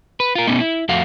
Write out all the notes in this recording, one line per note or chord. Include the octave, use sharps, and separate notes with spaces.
B4
F4 A#4
B2 A3 B3 C#4 D#4
E4
F2 A3 F#4 F5